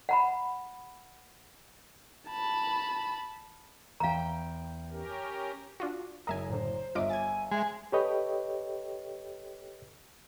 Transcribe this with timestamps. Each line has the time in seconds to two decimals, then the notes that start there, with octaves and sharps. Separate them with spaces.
0.09 F#5 A#5 B5
2.30 A5 B5
4.00 E2 F5 G5 A#5
4.91 C#4 G4 A#4
5.80 D4 F4 F#4
6.27 F#1 A#4 D#5 E5 G#5 A#5
6.50 A2 D3 C5
6.95 G1 F4 D#5 E5 D6
7.09 G#5 G#6 A6
7.51 G#3 E5
7.92 G4 A4 B4 C#5 D#5 G5